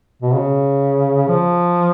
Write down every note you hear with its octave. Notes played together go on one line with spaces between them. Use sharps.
B2
C#3
F3